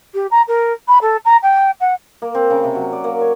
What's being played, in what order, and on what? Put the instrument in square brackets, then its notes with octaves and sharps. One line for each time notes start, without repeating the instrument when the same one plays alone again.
[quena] G4
A#5
A#4
B5
A4
A#5
G5
F#5
[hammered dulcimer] A#3
C4
C#3
C3
F#3
D5
A#3
C#5